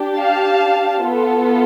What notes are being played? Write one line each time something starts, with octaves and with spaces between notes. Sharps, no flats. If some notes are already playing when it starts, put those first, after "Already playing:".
Already playing: D4 G4
F5 A5
B3 F4 A4